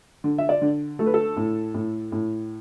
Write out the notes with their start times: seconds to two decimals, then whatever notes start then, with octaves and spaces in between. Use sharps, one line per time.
0.24 D3
0.38 E5
0.49 D5
0.62 D3
0.99 A3 A4
1.06 B4
1.14 A4
1.37 A2
1.74 A2
2.12 A2